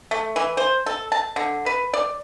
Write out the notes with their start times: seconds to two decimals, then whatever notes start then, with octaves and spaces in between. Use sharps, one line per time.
0.11 A3
0.36 E3
0.57 C5
0.86 A4
1.12 A5
1.36 D3
1.66 B4
1.93 D5